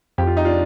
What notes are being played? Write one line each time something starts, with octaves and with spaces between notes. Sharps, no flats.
F2 G4
F4
D#4
D4 F4